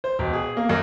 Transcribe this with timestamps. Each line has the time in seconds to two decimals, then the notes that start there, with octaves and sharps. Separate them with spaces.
0.04 C5
0.19 E1
0.33 G#4
0.57 A#3
0.69 F#2